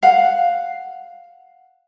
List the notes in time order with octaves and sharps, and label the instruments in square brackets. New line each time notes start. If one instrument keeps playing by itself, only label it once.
[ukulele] F5 F#5